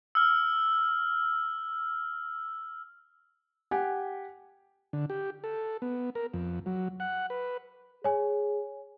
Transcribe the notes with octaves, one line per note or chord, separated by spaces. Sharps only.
E6 F6
G4 F#5 G#5
D3
G4
A4
B3
A#4
F2
F#3
F#5
B4
G#4 C#5 G#5